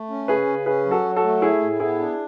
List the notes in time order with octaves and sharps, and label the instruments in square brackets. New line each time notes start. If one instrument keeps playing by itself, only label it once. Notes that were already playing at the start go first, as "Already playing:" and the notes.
Already playing: [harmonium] A3
C#4
[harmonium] C#3 [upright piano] G#4 B4
[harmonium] C#3
[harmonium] C#4 [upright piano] G#4 B4
[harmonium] F#3
[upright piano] F#4 A4
[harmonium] F#3
[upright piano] F#4 A4
[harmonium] A3
[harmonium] A2 [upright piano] E4 G#4
[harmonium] A2
[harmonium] B3 [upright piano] E4 G#4
[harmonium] D4